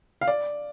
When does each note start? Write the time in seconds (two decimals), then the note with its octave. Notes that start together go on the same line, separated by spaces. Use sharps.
0.21 F5
0.27 D5